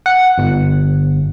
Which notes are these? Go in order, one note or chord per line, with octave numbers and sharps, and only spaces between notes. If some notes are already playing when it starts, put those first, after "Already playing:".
F#5
G1